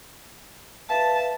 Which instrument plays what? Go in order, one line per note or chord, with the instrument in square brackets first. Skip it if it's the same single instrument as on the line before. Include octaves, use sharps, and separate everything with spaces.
[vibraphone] B4 E5 F5 [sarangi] A5